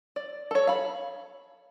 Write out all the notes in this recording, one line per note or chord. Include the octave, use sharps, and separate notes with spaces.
D5
A4 C#5
F5 B5